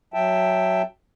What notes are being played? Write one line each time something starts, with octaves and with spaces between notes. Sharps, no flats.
F#3 E5 G5 A5